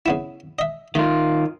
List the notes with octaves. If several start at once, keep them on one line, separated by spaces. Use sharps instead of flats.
C#3 B3 E4
D#5 E5
D#3 A3 F4